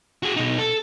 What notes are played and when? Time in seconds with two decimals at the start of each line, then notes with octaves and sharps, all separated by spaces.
0.23 F#4 G#4
0.36 B2 D#4
0.58 A4